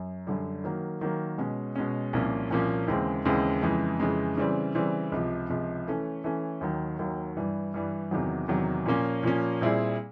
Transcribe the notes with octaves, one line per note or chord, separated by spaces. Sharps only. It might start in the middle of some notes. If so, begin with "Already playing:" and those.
Already playing: F#2
F#2 D3 G3
D#3 F#3 A#3
D#3 F#3 A#3
B2 G#3 C#4
B2 G#3 C#4
C2 A#2 F3 A#3 C#4
C2 A#2 F3 A#3 C#4
D#2 C#3 E3 G#3 C4
D#2 C#3 E3 G#3 C4
F2 C#3 E3 G#3
F2 C#3 E3 G#3
C#3 E3 G3 C4
C#3 E3 G3 C4
C#2 C3 F3
C#2 C3 F3
E3 A3 C#4
E3 A3 C#4
D#2 D#3 F#3
D#2 D#3 F#3
G2 E3 G3
G2 E3 G3
E2 C3 D#3 F#3
E2 C3 D#3 F#3
A#2 F3 A#3 C#4
A#2 F3 A#3 C#4
A#2 G3 C4 E4 G#4